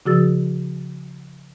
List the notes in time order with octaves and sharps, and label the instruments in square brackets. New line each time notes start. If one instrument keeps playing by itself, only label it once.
[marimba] C#3 F3 F#4 G#4 E6 A6